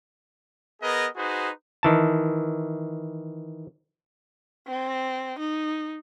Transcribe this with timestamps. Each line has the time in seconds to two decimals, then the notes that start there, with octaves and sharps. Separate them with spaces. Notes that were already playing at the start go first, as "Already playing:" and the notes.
0.82 B3 G#4 A#4 B4 D#5
1.16 D#4 F#4 G#4 B4 C5
1.83 D#3 E3 A5
4.68 C4
5.39 D#4